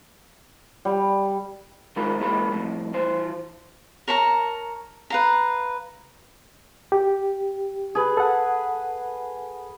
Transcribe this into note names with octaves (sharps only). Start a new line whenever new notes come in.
G3
D#3 G#3 D#4 F4 A#4 B5
A#2 E3 G#3 A#3 B5
F2 A2
E3 C5
A#4 C#5 A5 A#5
B4 F5 A#5
G4
G#4 B4
A4 F#5